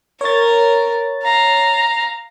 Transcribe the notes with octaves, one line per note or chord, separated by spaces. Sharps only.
A#4 C#5 A6
F5 A#5